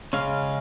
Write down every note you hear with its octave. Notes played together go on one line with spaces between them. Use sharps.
C#3 G#3 C#4 F5